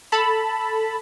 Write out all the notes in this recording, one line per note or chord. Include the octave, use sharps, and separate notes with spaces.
A4 A5 B5